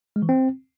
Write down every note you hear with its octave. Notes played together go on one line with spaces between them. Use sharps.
G#3
E3
C4